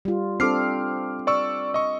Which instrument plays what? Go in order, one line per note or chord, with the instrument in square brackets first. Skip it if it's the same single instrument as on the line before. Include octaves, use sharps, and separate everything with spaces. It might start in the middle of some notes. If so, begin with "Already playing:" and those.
[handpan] G3 F4
[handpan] C4 D4 A4 [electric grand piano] D6 F6 C7
[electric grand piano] D5 C#6 E6
D#5 C#6